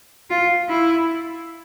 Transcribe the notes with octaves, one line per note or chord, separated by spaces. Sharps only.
F4
E4